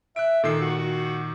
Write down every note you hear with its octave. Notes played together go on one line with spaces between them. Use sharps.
E5 F#6 D7
A#2 D#3 A4 C7
F#4
F#4